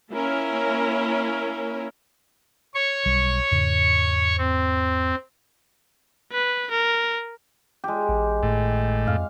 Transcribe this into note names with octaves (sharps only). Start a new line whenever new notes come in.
A#3 C#4 E4 A#4
C#5 C#6
B1 G3
E2 G#2 C#3
C4
B4
A#4
G#3 G4
A1
G#1 A2
F2 F5